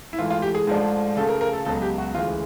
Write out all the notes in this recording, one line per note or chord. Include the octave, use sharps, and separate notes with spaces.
E4
G#2 E3 A3 F4
F4
G4
G#4
G#2 F3 A3 D4
C#3 F3 A3 A4
A#4
A#4
A4
C#2 B2 F#3 A4
G4
F#4
D2 C#3 E3 G#3 F4